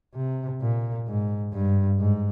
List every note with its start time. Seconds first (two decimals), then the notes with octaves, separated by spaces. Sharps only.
0.15 C3
0.61 A#2
1.07 G#2
1.53 G2
1.99 G#2